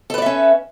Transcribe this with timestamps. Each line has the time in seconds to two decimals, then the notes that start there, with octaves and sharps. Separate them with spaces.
0.10 A4
0.14 B4
0.18 D5
0.22 E5
0.26 C#4